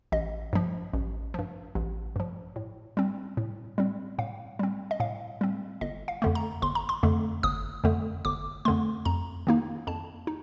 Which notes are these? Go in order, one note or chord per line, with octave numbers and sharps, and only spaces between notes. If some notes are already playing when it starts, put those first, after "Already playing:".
A1 D#5
G2 F3
A1
G2 F3
A1
G2 F3
A2
G3 C4
A2
G3 C4
A2 F5
G3 C4
D#5
A2 F5
G3 C4
G1 D#5
F5
F2 D3 A3
A#5
G1 C6
A#5
C6
F2 D3 A3
G1 D#6
F2 D3 A3
G1 D6
F2 D3 A3 C6
F2 A#5
D#3 A#3 D#4
F2 A5
D#4